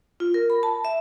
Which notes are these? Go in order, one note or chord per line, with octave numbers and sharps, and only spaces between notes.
F4
A#4
B5
A5
E5